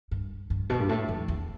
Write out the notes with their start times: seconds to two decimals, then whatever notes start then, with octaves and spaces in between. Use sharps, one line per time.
0.11 G2
0.50 G2
0.70 B2
0.80 G2
0.89 A2
1.08 F2
1.28 E2